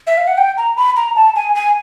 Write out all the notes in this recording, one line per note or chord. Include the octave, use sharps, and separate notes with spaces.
E5
F5
F#5
G5
A#5
B5
A#5
A5
G#5
G#5